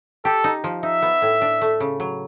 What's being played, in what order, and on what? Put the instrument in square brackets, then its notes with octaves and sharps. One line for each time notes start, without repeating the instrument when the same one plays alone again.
[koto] G4 [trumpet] A4
[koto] D#4
F3
[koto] D#4 [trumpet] E5
[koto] B3
A2
D4
A3
C#3
F#3